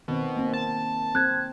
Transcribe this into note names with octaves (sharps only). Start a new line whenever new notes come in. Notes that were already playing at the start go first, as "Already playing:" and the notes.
B2 D#3 C4
A#3 C4
A5
C4 F#6 G#6